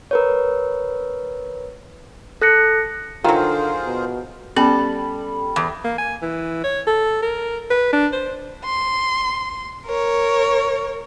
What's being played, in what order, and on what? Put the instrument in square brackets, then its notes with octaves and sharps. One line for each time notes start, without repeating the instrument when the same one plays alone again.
[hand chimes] A#4 B4 C#5
A4 F#6 A#6 C#7
[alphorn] D3 [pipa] D#3 F#3 [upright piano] F4 [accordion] G#4 A#4 C5
[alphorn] B2
[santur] G3 [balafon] B3 C#4 [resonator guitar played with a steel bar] A4
[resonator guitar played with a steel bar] E2
[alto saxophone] A#3
G#5
E3
C#5
A4
A#4
B4
D4
C5
[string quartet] C6
A#4 C#5